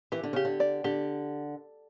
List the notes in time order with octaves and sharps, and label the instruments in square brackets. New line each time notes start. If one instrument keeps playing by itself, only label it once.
[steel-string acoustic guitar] E3 [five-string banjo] G4
[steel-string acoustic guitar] D3
[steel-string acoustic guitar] C#3 [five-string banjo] G4
[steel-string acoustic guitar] D3
[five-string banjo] D5
[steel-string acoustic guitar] D3 [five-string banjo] G4